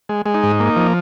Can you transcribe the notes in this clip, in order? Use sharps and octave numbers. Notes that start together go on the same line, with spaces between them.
G#3
G#3
D#4
G#2
A#3
F3